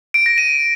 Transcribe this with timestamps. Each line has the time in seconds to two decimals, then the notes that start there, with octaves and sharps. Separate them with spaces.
0.14 D7
0.26 A#6
0.38 D#7